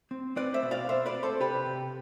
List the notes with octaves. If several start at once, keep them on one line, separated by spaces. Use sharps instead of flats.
C4
C4 B4 D5
C5 E5
B2
D5 F5
B2 C5 E5
B4 D5
C4
A4 C5
C3 G4 B4
C3